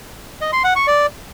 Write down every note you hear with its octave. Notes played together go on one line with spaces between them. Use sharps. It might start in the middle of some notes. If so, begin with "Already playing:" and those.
D#5
C6
F#5
C#6
D5